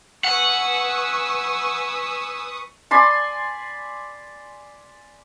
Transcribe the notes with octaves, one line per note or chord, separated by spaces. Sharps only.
B4 F#5 G#5 C#6 D#6 E6
D5 G#5 B5 C6